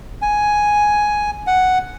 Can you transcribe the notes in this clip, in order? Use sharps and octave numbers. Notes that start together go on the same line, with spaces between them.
G#5
F#5